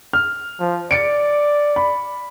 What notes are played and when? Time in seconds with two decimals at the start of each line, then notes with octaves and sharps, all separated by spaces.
0.13 F6
0.60 F3
0.91 D5 A6 C#7 D7
1.76 B5